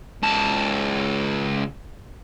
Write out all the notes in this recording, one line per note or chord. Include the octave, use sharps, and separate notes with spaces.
C#2 A5